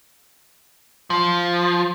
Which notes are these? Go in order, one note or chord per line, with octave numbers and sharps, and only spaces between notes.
F3